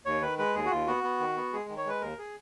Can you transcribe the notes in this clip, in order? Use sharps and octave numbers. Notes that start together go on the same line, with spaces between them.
D#2 C#5
D#3 B4
G#3 B4
D#2 G#4
F#4
D#2 F4
B3 F#4
B3
D#3
B3
G#3 G#4
D#3
C#5
G#3 B4
D#2 A#4
G#4